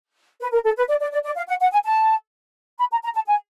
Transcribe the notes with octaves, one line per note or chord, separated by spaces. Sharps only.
B4
A#4
A4
B4
D5
D5
D5
D5
F5
F#5
F#5
G#5
A5
B5
A#5
A#5
A5
G#5